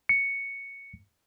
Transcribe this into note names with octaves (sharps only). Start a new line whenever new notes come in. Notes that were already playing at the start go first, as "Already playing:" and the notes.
C#7